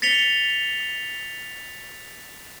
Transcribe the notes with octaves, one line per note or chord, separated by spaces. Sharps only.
A6 B6 C#7 F7 G7